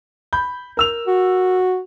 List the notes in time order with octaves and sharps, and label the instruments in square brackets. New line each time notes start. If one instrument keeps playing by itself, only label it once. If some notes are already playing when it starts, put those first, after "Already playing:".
[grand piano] B5 G6
A#4 E6 F7
[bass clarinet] F#4